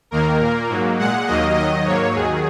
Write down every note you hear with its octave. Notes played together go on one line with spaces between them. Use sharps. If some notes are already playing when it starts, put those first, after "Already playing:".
D#2 D#3 A#3 A#4
A#2 A#3
G#2 F#3 A#3
A#2 G#3 F#5
D#2 D#3 F#3 A#3 D#5
D#2 D#3 F#3 D#5
G#2 F#3 A#3 C#5
D#2 D#3 F#3 G#4